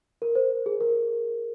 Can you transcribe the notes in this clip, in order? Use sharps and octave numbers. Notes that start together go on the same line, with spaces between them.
A#4
C5
G#4
A#4